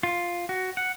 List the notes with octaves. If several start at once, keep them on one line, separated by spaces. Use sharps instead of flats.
F4
F#4
F#5